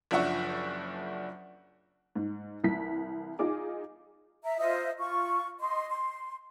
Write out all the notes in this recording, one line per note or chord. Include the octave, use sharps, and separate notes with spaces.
F#1 F3 D4 E5 F#5 C#6
G#2
C2 E3 B6
D#4 F4 G#4 D6
E5 A#5
F4 C5 D#5 E5
F4 C#6
D#5 C6
C6